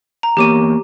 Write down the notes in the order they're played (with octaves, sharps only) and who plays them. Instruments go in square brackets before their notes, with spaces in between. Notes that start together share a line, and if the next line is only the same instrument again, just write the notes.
[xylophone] A#5
[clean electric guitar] E2 A#3 C#5 [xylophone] G4 D6 D#7